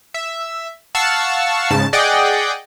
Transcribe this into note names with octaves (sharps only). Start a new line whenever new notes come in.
E5
F5 F#5 A5 C#6 E6
G#2 C#3 A5
G#4 D5 D#5 F#5 G5